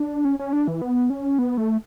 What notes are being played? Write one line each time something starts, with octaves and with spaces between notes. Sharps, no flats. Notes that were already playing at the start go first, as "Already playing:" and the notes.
Already playing: D4
C#4
C#4
D4
E3
B3
C#4
B3
A3